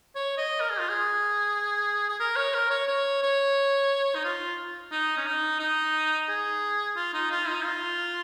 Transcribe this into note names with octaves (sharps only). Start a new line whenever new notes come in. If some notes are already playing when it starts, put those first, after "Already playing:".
C#5
D#5
A#4
G#4
F4
G#4
G#4
A#4
C#5
A#4
C#5
C#5
C#5
D#4
F4
D#4
C#4
D#4
D#4
G#4
F4
D#4
F4
D#4
F4